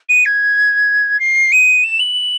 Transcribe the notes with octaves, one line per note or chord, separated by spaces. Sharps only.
D#7
G#6
C7
D#7
E7
F#7